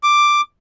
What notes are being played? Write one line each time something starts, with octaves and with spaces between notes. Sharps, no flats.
D6